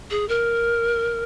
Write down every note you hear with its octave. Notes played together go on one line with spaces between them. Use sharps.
G#4
A#4